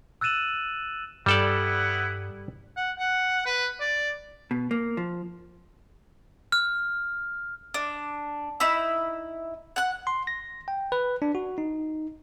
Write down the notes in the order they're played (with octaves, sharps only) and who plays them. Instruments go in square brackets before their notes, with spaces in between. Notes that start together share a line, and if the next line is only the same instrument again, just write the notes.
[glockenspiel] E6 F#6 A6 D#7 E7 F#7
[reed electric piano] G2 [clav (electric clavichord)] G3 A4 D5 [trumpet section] B3 E4 F#5
[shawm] F#5
F#5
B4
D5
[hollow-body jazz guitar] B2
A#3
F3
[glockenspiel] F6
[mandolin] D4
D#4 E4 B5 E6
F#5 F#6
[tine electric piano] C6
A#6
G5
B4
D4
F#4
D#4